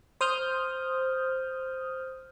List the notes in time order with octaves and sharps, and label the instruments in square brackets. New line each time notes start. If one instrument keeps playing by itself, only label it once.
[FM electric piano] C5 D#6 F6 G6